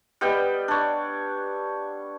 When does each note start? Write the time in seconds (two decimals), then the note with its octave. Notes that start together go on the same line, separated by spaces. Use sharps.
0.21 G3 B3 D#5 G5
0.68 D4 C#5